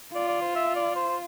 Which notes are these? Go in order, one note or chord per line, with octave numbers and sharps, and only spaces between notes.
F4 D5
D5
C5
E5
D5
C5